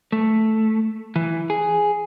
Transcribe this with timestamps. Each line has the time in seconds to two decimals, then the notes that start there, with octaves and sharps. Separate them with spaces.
0.12 A3
1.16 E3
1.50 G#4